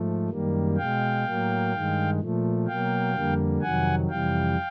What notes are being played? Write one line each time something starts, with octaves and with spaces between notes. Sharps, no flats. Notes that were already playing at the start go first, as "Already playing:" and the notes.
Already playing: G#2 F3 A3
F#2 D#3 G3 A#3
B2 G#3 F5 G5
A2 F#3 A#3
G2 D#3 G#3
A#2 F3 A3
B2 F#3 A#3 F5 G5
F2 D3 G3 A#3
F2 C3 D#3 F#3 F#5 G#5
F2 C3 E3 G3 F5 G5